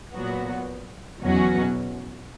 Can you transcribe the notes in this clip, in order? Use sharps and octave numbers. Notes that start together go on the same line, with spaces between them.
A#2 F#3 B3 F#4
E2 B2 F#3 C#4 F#4